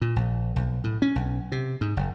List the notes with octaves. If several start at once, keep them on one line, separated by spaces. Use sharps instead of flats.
A#2
A#1
B1
A2
C#4
B1
C3
G#2
F#1